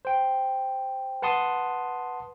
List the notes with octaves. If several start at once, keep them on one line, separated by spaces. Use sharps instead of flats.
C5 G5
B4 F#5 A5 C6 D#6